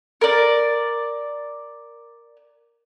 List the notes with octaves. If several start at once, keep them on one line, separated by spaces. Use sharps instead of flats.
A#4 D5